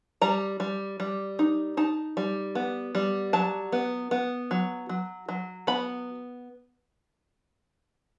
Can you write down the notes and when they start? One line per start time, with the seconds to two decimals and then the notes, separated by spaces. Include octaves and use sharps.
0.22 G3 A#5
0.60 G3
1.00 G3
1.39 D#4
1.77 D#4 A5
2.17 G3
2.55 B3
2.95 G3
3.33 F#3 A5
3.72 B3
4.11 B3
4.51 F#3
4.89 F#3
5.29 F#3
5.67 B3 B5